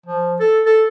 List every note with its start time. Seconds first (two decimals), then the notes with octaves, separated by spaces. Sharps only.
0.06 F3
0.40 A4
0.66 A4